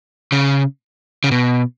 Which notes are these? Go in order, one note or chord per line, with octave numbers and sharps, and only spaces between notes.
C#3
C#3
B2